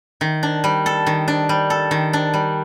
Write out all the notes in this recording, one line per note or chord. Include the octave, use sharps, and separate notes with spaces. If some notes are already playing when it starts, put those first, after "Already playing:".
D#3
D4
G3
A4
D#3
D4
G3
A4
D#3
D4
G3